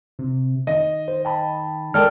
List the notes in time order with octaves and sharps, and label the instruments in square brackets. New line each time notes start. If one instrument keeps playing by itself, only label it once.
[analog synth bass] C3
[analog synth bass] D#3 [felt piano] D#5
[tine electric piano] C5
G5 A5 B5
[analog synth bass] G#3 [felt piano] A4 D5 G5 [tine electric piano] A#4 A5 F6